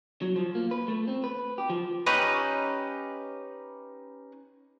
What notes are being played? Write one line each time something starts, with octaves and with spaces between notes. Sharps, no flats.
F#3
F3
A#3
B4
A3
C4
B4
G4
F3
C#4 D#4 G4 B4